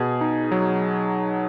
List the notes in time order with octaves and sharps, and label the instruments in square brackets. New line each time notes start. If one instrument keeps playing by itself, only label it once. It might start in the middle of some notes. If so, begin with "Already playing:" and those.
Already playing: [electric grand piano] B2 G#4
D#4
F#3